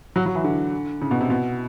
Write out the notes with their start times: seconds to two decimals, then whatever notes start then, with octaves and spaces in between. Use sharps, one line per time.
0.16 F#3
0.26 F#3
0.35 E3
0.44 D3
1.02 C#3
1.11 B2
1.21 C3
1.30 B2